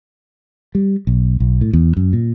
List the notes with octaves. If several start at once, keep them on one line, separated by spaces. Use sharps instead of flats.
G3
B1
B1
A2
E2
F#2
A#2